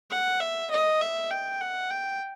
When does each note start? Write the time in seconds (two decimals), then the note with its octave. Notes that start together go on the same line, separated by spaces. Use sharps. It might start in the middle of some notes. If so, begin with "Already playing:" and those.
0.10 F#5
0.40 E5
0.71 D#5
1.01 E5
1.31 G5
1.61 F#5
1.91 G5